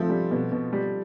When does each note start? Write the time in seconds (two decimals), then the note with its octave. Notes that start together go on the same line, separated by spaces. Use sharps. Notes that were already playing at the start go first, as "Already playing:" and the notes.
Already playing: F3 A3 C4
0.10 G3
0.31 B2
0.52 B2
0.73 G3